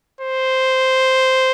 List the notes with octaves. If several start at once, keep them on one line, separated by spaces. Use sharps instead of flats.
C5